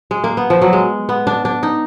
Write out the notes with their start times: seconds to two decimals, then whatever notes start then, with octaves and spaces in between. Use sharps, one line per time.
0.11 G#3
0.24 A#3
0.37 B3
0.50 F3
0.62 F#3
0.73 G#3
1.09 B3
1.27 D4
1.45 D4
1.63 D#4